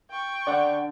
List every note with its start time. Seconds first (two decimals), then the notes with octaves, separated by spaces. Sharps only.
0.10 G5 C#6
0.47 D3 D5 F#5